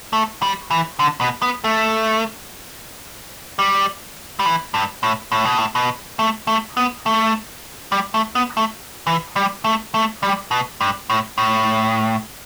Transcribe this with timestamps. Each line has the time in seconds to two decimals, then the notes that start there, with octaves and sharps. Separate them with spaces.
0.13 A3
0.42 G3
0.71 E3
0.99 D3
1.21 B2
1.42 B3
1.64 A3
3.59 G3
4.39 G3
4.46 E3
4.74 G2
5.03 A2
5.32 A2
5.45 B2
5.58 A2
5.75 B2
6.19 A3
6.47 A3
6.77 B3
7.06 A3
7.92 G3
8.14 A3
8.35 B3
8.57 A3
9.07 E3
9.36 G3
9.64 A3
9.94 A3
10.23 G3
10.51 B2
10.81 G2
11.10 A2
11.38 A2